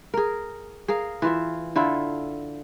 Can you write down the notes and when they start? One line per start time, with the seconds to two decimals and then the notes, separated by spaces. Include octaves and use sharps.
0.14 G#4 A#4
0.88 G#4 A#4 F5
1.22 E3 F4 E5
1.76 D3 E4 F4 A4